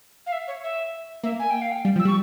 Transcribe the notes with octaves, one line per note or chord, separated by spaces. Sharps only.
F5
E5
C#5
E5
A#3 E5
G#5
G5
F5
G5
G3
F3
E6
G3 C#6